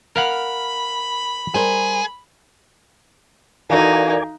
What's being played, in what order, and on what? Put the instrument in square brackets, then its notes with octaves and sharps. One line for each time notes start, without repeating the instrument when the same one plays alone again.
[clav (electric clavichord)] A#4 F5 F#5 [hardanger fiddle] B5
[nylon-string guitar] G3 A#4 C5 [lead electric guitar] G#4
[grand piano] E3 F#4 A4 [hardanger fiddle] D#4 [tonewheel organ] A#4 D5 G#5 [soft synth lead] F5